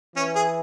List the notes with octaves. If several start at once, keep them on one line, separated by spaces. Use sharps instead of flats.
E3 C#4
G#4